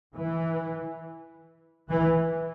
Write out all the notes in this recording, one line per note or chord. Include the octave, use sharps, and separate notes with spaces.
E3
E3